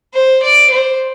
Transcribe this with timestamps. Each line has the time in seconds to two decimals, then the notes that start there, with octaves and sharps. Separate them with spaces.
0.14 C5
0.43 D5
0.70 C5